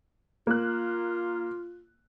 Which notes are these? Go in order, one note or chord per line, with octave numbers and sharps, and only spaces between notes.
A#3 F4 F#6